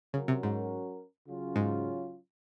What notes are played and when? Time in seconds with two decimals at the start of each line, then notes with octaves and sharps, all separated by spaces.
0.14 C#3 F#3 C#4 F#4 A#4
0.28 C3
0.43 G#2
1.27 C#3 F#3 C#4 F4
1.56 G#2